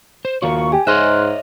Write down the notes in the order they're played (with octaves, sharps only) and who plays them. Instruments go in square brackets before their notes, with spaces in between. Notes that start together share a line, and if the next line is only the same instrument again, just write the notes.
[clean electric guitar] C5
[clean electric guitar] D#2 F#4 [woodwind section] F4 A#4 C#6
[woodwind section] G4 [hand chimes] G#5
[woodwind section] G#2 [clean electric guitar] C#5 D#5 E5 [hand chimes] C6 F6 F#6